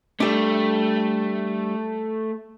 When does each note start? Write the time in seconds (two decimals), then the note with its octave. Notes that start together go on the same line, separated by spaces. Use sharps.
0.20 G3 A3 D4